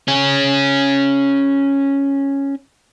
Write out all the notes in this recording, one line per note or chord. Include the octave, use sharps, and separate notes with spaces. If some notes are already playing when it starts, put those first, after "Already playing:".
C#4 G#4